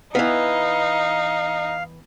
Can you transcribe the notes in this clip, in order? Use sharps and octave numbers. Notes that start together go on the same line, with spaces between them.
E3 B3 D#4 F5